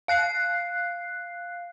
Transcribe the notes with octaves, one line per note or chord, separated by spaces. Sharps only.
F5 F#6 C7